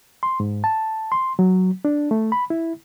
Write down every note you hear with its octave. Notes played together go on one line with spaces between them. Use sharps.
C6
G#2
A5
C6
F#3
D4
A3
B5
E4